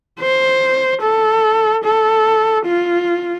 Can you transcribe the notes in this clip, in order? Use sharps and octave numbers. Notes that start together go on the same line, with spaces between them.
C5
A4
A4
F4